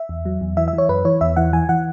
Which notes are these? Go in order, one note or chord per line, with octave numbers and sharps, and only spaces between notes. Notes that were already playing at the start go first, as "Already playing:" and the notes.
Already playing: E5
E2
F#3
E2
E3 E5
E5
E3
C#5
F#2 B4
E3 C#5
E2 E5
E3 F#5
E3 G#5
E3 F#5